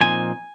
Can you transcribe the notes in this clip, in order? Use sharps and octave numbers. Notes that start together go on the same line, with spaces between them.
A#2 F3 C4 D#4 G#5